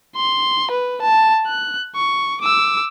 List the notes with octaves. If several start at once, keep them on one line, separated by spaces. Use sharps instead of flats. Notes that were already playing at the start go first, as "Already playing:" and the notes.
C6
B4
A5
F#6
C#6
D6 E6